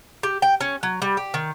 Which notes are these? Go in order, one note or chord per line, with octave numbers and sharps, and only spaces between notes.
G4
G5
C#4
F#3
G3
G4
D#3